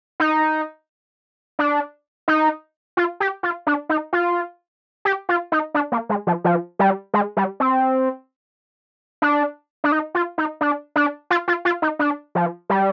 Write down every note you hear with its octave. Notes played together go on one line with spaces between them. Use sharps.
D#4
D4
D#4
F4
G4
F4
D4
D#4
F4
G4
F4
D#4
D4
A#3
G#3
F3
F3
G3
G#3
G3
C4
D4
D4
D#4
F4
D#4
D4
D4
F4
F4
F4
D#4
D4
F3
G3